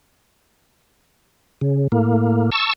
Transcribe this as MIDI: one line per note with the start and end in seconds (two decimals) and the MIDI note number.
1.61 1.88 49
1.92 2.50 45
1.92 2.50 58
2.52 2.73 81
2.52 2.73 85
2.52 2.73 88